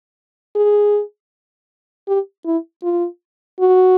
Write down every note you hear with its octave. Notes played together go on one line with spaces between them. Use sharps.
G#4
G4
E4
F4
F#4